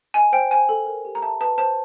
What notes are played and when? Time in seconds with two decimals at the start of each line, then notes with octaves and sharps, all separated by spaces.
0.14 D#5 G#5
0.32 C5 G5
0.51 C5 G#5
0.69 A4
0.86 A#4
1.05 G4
1.15 A#5
1.22 E5 A5
1.41 B4 A5
1.58 C5 A5